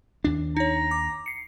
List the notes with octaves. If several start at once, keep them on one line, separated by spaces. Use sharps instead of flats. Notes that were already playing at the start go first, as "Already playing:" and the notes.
D#2 D4
D#4 C#5 A#5
D6
C7 C#7